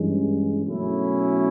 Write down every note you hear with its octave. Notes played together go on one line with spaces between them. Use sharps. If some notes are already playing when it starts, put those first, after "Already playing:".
Already playing: G2 E3 G#3 C#4
B2 F#3 A3 C#4 E4